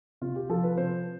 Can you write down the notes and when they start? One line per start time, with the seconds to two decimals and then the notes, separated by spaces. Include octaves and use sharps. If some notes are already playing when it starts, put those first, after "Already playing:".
0.21 C3 F4
0.36 G4
0.49 F3 A4
0.63 B4
0.77 C3 C5